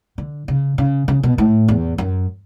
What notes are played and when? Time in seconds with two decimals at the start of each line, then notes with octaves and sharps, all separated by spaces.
0.18 D3
0.48 C#3
0.78 C#3
1.08 C#3
1.23 B2
1.38 A2
1.68 E2
1.98 F#2